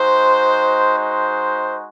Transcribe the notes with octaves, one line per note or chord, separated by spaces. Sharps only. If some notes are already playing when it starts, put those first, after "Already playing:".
Already playing: G#3 D#4 F#4 C5
C5